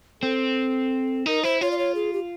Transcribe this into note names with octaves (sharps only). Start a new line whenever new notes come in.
C4 A4
D#4 A#4
E4 C5
F4 C#5
D5
C#5
G#4
G4